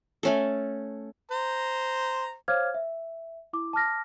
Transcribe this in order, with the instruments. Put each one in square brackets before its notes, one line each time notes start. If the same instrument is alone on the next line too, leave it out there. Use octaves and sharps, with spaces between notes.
[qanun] A3 C#4 A4
[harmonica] C5 A#5
[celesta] C5 C#5 F5 D6 F6 G#6
E5
E4 D6
A5 D6 F6 A#6